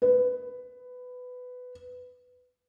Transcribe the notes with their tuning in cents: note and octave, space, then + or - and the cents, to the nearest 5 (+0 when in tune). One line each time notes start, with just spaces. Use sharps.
B4 +15